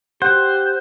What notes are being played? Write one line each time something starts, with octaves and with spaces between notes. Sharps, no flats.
G4 C5 F#5 F#6